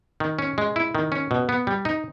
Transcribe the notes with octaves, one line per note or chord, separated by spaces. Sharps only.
D#3
C#4
G#3
E4
D#3
C#4
B2
B3
G3
D#4